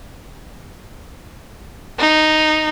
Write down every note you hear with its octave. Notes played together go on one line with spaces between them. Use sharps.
D#4